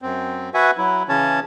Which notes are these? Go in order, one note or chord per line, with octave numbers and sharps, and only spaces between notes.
F#2 C4
F#4 B4 E5 F#5 G#5
F#3 E4
C#3 E3 C#4 C#5 A5